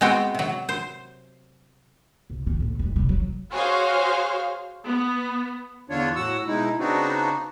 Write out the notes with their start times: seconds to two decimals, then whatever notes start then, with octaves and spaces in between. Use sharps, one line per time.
0.01 G#3 B3 C4 F#4 G5
0.35 C3 F#3
0.69 C5
2.30 C2
2.47 D#3
2.60 B1 A2
2.79 F#2 G3
2.96 C3 G3
3.09 F#3
3.51 F#4 G#4 C5 C#5 F5
4.86 B3
5.90 E2 D3 D4 F4 C#5
6.16 A2 F#3 F#4 F#5 E6
6.47 B2 G#3 D#4 E4
6.79 C#3 B3 C4 D4 D#4 F#4